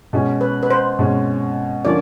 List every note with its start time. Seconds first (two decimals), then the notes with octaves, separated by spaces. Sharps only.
0.13 B2 G#3 C#4
0.41 B4
0.63 B4
0.70 C5
0.99 B2 G#3 C#4
1.84 D3 F3 A#3 C#4 D5